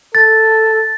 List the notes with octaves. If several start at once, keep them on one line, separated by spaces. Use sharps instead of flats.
A4 A6